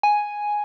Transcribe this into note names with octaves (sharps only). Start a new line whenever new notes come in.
G#5